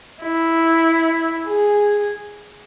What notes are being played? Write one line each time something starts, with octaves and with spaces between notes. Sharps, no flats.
E4
G#4